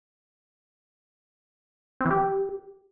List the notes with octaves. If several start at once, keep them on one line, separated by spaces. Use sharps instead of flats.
C4
E3
G4